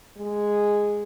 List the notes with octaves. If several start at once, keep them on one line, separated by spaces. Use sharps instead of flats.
G#3